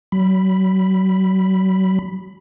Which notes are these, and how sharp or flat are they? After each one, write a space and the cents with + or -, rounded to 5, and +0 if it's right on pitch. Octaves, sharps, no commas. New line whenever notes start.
F#3 +30 B5 +0